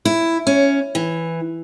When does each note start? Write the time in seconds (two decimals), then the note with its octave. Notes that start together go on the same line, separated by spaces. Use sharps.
0.05 E4
0.47 C#4
0.95 E3